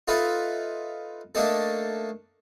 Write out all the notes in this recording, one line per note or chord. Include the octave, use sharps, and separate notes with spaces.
D#4 F4 A4 B4 E5
A3 A#3 D4 D#4 A4